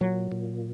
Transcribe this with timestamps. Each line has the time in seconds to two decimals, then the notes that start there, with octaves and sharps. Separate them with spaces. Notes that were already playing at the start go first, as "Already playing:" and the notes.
0.01 A#2 F#3
0.32 A#2